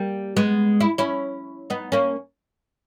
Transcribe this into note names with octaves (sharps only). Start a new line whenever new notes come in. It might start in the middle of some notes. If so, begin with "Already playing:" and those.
Already playing: G3 A#3
G#3 B3
E4
C#4 E4
B3 D#4
A#3 C#4